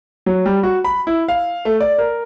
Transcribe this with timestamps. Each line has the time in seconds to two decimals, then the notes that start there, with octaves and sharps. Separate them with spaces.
0.26 F#3
0.46 G3
0.63 F#4
0.84 B5
1.07 E4
1.28 F5
1.65 A3
1.80 D5
1.98 A#4